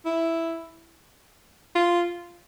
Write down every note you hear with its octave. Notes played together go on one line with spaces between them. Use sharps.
E4
F4